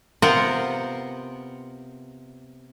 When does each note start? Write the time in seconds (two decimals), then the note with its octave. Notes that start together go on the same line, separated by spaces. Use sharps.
0.22 C3 B3 F4 A#4 C5 F#5